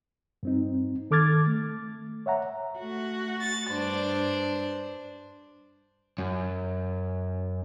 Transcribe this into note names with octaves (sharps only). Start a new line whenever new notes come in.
G2 C4 D#4
D#3 A4 D6 F6 G#6 A6
A3
C#5 E5 F#5 A#5
A3 F#4
A6
G2 D4 C5
F#2